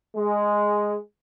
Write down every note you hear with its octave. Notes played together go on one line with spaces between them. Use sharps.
G#3